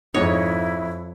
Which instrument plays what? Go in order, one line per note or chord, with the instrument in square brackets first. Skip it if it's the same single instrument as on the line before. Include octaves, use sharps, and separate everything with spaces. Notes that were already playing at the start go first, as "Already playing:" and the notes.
[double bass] F2 [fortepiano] G#2 D#4 [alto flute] E4 [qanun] C#5